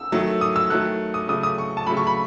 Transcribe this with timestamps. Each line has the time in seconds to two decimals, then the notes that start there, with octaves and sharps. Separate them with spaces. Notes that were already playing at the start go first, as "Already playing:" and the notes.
Already playing: E6
0.12 D#3 F#3 A3
0.41 D#6
0.56 E6
0.70 D#3 F#3 A3 F#6
1.14 D#6
1.28 C#3 F#3 A3 D#6
1.43 D#6
1.58 C#6
1.77 A5
1.87 C#3 F#3 A3 B5
1.97 C#6
2.07 B5